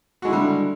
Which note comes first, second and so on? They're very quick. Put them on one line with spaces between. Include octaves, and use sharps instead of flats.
F#4 G#3 E4 D3 G3